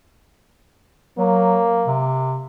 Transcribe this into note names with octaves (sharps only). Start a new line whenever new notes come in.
F#3 A#3
C3